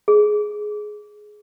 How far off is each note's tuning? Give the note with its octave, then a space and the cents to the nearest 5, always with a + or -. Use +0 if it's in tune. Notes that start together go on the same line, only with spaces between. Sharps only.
G#4 +10